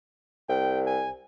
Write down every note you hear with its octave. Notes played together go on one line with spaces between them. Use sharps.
C2 G5
G#5